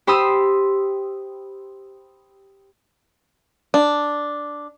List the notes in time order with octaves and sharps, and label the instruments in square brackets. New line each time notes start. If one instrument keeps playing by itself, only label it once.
[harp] G4 C5 B5 C6 D#6 E6
[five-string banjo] D4